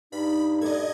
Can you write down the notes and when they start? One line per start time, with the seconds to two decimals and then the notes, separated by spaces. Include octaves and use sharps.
0.12 G2 D#4 B5
0.61 A4 D5 D#5 G#6